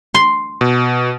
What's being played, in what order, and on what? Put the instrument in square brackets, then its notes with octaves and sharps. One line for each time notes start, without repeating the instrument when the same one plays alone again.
[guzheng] C6
[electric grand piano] B2